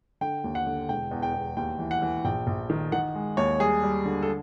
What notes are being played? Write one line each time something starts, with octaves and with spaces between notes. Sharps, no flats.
D3 G5
D#2
F#5
D3
E1 G5
E2
G5
E2
D#2 G5
E3
F#5
E3
A#1 G5
A#1
D#3
D#3 F#5
G#3
D#2 C#5
G3 G#4
G3
D3
A4